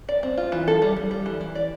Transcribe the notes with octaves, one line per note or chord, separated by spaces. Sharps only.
D5
C4
F4
E3
A4
G3
G3
G3
E3
E3
D5